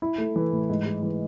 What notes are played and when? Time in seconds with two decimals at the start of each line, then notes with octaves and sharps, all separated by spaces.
0.02 E4
0.18 A3
0.36 E3
0.52 A2
0.70 G#2
0.86 G#3
1.03 E3